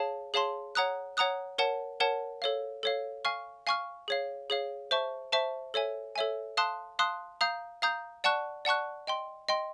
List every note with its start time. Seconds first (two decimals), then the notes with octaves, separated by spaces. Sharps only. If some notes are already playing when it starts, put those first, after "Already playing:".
Already playing: G#4 C#5 F5 A5
0.34 G#4 C#5 F5 A5 C6
0.75 C#5 F#5 A#5 D#6 F#6
1.17 C#5 F#5 A#5 D#6 F#6
1.58 A#4 C#5 F#5 A5
2.00 A#4 C#5 F#5 A5
2.42 A4 C#5 F5
2.83 A4 C#5 F5
3.25 F5 G#5 C#6 F6
3.67 F5 G#5 C#6 F6
4.08 G#4 C#5 F5
4.50 G#4 C#5 F5
4.91 C5 E5 A5 C#6
5.32 C5 E5 A5 C#6
5.74 A4 C#5 E5 G#5
6.16 A4 C#5 E5 G#5
6.57 F5 A5 C6 D#6 F#6
6.99 F5 A5 C6 D#6 F#6
7.41 F5 A#5 D#6 G6
7.82 F5 A#5 D#6 G6
8.24 D5 F#5 A5 C#6 F#6
8.65 D5 F#5 A5 C#6 F#6
9.07 D#5 G5 C6
9.49 D#5 G5 C6